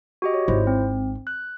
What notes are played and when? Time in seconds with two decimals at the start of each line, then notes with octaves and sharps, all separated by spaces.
0.22 F#4 G4 D#5
0.34 C#5
0.48 G#1 E4 C5
0.67 C4
1.27 F#6